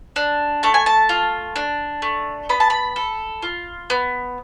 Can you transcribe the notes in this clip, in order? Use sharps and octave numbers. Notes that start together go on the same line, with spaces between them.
D4
A3 A5
G#5
A5
F4
D4
A3
B3 B5
A5
B5
A4
F4
B3